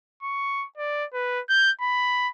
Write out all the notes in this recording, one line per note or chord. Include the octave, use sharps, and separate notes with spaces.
C#6
D5
B4
G6
B5